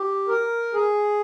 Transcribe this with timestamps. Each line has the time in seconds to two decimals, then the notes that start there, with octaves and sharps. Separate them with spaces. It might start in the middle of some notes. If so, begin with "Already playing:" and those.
Already playing: G4
0.28 A#4
0.74 G#4